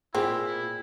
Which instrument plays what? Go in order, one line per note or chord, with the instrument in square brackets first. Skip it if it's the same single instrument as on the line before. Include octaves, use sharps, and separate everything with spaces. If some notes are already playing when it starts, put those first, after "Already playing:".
[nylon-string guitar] A#2 [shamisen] C4 [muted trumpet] E4 [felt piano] G#4 G5 G#5